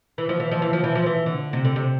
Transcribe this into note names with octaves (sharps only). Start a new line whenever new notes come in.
E3
F3
E3
F3
E3
F3
E3
F3
E3
D3
C3
D3
C3